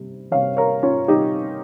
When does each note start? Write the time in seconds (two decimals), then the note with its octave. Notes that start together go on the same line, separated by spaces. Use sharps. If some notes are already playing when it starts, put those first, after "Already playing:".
Already playing: C3 G3
0.31 C3 G3 C#5 F5
0.57 A#4 C#5
0.83 C#4 F4
1.08 C3 G3 D#4 G4